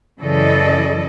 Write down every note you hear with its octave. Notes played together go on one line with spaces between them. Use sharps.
F#2 C#3 E3 A4 D5 D#5